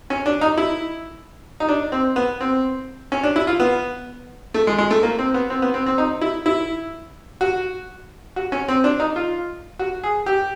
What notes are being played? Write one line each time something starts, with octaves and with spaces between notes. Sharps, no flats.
C#4
D4
D#4
E4
D#4
D4
C4
B3
C4
C#4
D4
E4
F4
B3
A3
G#3
G#3
A3
A#3
C4
B3
C4
B3
C4
C4
D#4
E4
E4
F#4
F#4
C#4
C4
D4
D#4
F4
F#4
G#4
G4